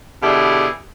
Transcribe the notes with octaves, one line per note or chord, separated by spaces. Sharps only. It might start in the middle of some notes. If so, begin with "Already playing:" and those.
B2 D3 E4 G4 G#4